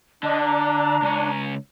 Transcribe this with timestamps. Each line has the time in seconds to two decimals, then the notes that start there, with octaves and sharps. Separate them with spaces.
0.23 D3 D4 D#5
0.45 A#5
1.02 C#2 C#4